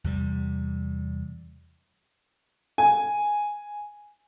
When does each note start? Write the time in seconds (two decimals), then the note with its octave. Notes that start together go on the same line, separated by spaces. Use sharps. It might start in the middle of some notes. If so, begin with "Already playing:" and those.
0.04 E2 C3 G3
2.78 G#5